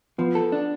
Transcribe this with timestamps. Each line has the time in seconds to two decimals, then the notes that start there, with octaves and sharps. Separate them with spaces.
0.18 F3 B3
0.35 A4
0.52 D4